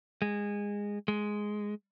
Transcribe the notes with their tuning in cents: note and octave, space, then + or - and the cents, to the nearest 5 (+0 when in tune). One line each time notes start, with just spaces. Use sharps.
G#3 -20
G#3 +5